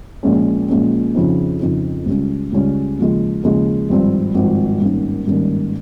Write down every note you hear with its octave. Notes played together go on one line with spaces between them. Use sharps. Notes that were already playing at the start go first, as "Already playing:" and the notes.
A#1 A#2 G#3 C#4
A#1 A#2 G#3 C#4
F2 C#3 F3 C4 D#4
F2 C#3 F3 C4 D#4
C#2 C#3 G3 C#4
C#2 C#3 G3 C#4
D#2 C#3 F3 G#3
D#2 C#3 F3 G#3
G#1 G2 F3 C4
G#1 G2 F3 C4
G#1 G2 D#3 A#3 C#4
G#1 G2 D#3 A#3 C#4